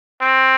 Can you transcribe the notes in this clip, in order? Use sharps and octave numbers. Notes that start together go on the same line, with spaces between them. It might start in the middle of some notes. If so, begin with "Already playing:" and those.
C4